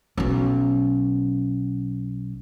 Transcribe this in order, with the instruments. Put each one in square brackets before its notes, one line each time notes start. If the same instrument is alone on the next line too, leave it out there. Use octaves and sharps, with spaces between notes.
[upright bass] B1 C#4